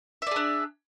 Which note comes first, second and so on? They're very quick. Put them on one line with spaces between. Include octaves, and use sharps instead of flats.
E5 D5 G#4 D4